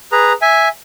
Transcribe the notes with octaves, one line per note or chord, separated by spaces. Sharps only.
G#4 B4 A#5
E5 G#5